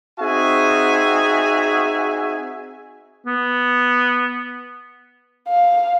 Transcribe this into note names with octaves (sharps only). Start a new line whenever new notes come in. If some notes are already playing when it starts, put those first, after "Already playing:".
C4 D#4 F#4 G#4 E5 G#5
B3
F5